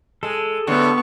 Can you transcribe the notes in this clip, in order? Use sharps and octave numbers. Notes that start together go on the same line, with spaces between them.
G#3 A4
A2 D3 G3 B3 C#6